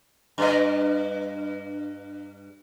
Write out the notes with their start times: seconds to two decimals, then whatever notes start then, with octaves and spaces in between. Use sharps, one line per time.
0.38 G2 D#5